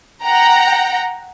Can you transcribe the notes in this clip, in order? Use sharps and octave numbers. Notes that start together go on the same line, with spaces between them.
F#5 G5 A#5